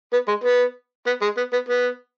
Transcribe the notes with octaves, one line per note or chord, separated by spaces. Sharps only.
B3
G#3
B3
B3
G#3
B3
B3
B3